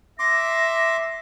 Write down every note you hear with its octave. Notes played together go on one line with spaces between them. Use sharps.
E5 C6 D6 A#6